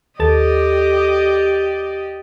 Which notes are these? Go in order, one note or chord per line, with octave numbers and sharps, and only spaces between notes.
D#2 G4 A4 D5 D#5 A6